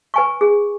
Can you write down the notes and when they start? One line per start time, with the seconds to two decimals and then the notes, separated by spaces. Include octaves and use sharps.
0.14 B4 G#5 C#6
0.41 G#4